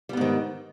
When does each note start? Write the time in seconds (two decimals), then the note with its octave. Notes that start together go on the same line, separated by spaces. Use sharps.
0.09 G3
0.13 B3
0.17 G#2
0.21 D#3